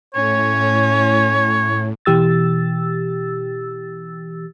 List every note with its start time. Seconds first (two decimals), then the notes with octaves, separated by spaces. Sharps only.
0.15 A2 C#4 C#5
2.05 B2 E3 G4 E6 A6